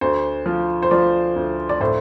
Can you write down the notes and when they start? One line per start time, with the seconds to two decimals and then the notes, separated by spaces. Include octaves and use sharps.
0.01 D2 C5
0.46 F3
0.82 C5
0.91 F3 D5
1.36 D2
1.69 D5
1.81 A2 C5